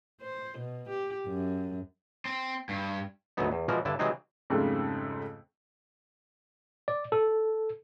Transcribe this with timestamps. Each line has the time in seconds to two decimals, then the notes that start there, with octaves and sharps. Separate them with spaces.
0.21 C5
0.58 B2
0.89 G4
1.27 F#2
2.25 C4
2.69 G2
3.37 D2 G#2 F#3 B3 D#4
3.51 E2
3.68 B2 E3 F3 G#3 F#4 A#4
3.85 G2 D3 E4 A5
3.99 C3 E3 F#3 G#3 C4 D#4
4.50 F2 G#2 C#3 G3 A3 C4
6.88 D5
7.12 A4